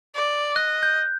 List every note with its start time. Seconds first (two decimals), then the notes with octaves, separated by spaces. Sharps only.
0.15 D5
0.56 D#5 F#6
0.83 G6